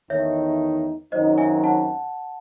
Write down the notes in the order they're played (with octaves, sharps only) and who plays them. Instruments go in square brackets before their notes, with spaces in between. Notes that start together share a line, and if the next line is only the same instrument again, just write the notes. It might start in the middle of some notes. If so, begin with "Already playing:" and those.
[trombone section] E2 D#3 A3 D#4 [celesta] C#5 E5
[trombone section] F#2 D#3 F#3 C4 D#4 [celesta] C5 D#5
[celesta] E5 G#5
F#5 A5